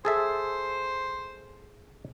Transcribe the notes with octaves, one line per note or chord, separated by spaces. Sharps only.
G#4 A4 C5 E5